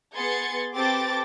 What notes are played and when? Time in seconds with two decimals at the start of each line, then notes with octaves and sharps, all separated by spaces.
0.15 B3 G#4 C6 G#6 A6 C#7
0.75 C4 G4 A4 B4 D6 A6